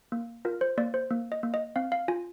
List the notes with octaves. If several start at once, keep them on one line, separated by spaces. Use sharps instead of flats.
A#3
F4 A#4
C5
A#3 D5
C5
A#3
D#5
A#3
D#5
C4 F5
F5
F4 G#5